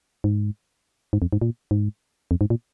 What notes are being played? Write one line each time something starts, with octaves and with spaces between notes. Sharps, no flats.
G#2
G#2
F2
G#2
A#2
G#2
F2
G#2
A#2